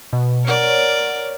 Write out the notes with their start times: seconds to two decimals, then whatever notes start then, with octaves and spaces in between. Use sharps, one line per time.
0.13 B2
0.45 A#4 C#5 D5 F#5